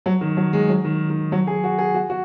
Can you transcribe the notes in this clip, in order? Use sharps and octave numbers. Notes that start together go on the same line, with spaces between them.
F#3
D#3
F#3
G#3
F#3
D#3
D#3
F#3
G#4
F#4
G#4
F#4
F#4